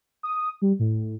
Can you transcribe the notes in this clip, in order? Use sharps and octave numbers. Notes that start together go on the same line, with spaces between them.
D#6
G3
A2